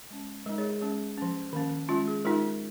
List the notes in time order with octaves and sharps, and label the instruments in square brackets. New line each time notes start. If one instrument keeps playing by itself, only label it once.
[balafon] G#3 C#4
G#3 D#4 A#4 D#5
G#4 C#5
G#4
G#3 C#4 G#4
F3 C#4
D#3 A#3 C#4
G#3 C#4 F4
G#4
G#3 D#4 F4 A#4